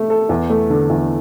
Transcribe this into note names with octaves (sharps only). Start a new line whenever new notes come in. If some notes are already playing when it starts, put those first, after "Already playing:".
Already playing: A3 E5
A4
E2
A3
D3
E2